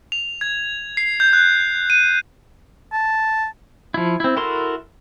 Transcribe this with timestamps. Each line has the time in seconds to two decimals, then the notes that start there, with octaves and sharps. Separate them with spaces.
0.12 F7
0.41 G#6
0.97 C7
1.20 G6
1.33 F#6
1.90 D#7
2.92 A5
3.94 F3 E4
4.20 C4 E4
4.37 E4 F#4 A4 A#4 C6